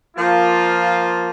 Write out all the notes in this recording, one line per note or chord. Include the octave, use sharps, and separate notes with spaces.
F3 A#3 F4